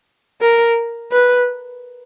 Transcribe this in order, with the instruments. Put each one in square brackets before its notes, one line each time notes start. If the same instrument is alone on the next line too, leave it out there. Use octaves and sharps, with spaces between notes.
[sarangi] A#4
B4